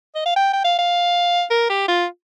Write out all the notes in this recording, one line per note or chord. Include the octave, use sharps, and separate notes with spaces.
D#5
F5
G5
G5
F5
F5
A#4
G4
F4